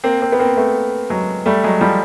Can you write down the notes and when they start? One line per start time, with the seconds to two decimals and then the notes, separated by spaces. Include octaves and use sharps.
0.04 A#3 C4
0.22 A#3 C4
0.32 B3
0.39 A#3 C4
0.57 A3 B3
1.10 F#3 G#3
1.46 G3 A3
1.64 F#3 G#3
1.81 F3 G3